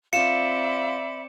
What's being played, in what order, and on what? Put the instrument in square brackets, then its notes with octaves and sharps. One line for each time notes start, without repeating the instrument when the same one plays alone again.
[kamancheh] C4 D5 [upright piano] F4 [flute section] E5 B5 [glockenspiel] C#7 E7